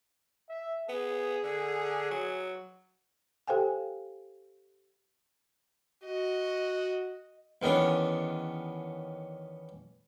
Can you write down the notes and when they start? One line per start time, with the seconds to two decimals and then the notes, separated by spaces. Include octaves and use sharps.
0.49 E5
0.89 B3 G#4
1.44 D3
2.11 F#3
3.47 G4 A4 C5 F5 G5 G#5
6.04 F#4 D#5
7.62 E2 D#3 B3 C#4 D4